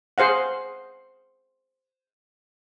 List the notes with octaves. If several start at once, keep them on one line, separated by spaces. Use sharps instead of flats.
G#4 C5 F5 F#5